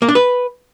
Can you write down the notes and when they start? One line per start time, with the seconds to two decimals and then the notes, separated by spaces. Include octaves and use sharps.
0.02 A#3
0.09 D4
0.15 B4